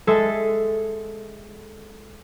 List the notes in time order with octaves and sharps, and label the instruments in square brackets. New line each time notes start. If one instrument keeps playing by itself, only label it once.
[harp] G#3 A4 E5